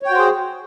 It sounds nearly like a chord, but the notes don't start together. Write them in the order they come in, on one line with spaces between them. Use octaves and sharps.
C#5 G5 F#4 C5 G#4